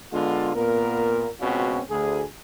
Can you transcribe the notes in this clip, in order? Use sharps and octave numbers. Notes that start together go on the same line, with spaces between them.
D3 G#3 B3 F4
A#2 B3 A#4
C#2 B2 C4 C#4 F4 F#4
D2 G#4